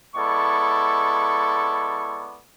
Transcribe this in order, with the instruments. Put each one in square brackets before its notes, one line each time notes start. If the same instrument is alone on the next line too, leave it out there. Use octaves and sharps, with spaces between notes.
[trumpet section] G#3 B3 E4 A4 D5 C#6